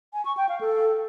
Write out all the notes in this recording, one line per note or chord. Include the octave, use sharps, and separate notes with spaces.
G#5
C#6
G5
F5
A4